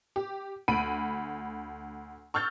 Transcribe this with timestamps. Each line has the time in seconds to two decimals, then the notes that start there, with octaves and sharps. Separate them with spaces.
0.16 G4
0.68 D2 B5 D7 D#7
2.34 C#6 E6 F6 G6 A6